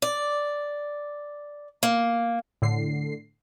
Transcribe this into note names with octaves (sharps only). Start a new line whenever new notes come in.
D5
A#3
A2 D3 C7